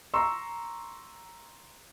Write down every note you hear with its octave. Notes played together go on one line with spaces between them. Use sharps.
A#5 C6 C#6 E6